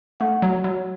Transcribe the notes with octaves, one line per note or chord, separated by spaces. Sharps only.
A3 F#5
F#3
F#3